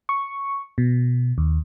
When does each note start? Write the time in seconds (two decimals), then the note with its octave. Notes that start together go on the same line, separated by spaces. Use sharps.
0.09 C#6
0.78 B2
1.38 D#2